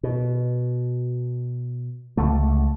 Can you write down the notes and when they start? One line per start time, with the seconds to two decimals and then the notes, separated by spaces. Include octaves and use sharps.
0.03 B2
2.17 C#2 D3 A3